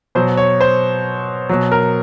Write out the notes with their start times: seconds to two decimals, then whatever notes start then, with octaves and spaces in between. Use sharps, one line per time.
0.15 B2 F#3 C5
0.37 C#5
0.61 C5
1.49 B2 F#3
1.71 A#4